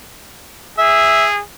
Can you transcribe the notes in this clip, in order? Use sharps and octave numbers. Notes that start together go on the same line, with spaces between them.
G#4 E5